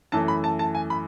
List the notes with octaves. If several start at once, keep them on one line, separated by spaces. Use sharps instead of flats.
F#2 E3 A3 A5
B5
A5
A5
G#5
B5